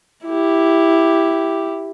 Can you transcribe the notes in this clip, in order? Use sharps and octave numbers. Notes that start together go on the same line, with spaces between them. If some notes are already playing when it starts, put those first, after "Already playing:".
E4 G4